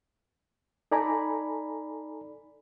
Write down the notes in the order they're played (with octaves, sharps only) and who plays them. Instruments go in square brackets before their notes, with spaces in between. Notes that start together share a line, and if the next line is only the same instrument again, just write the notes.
[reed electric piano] D#4 A4 D5 G#5 A#5 B5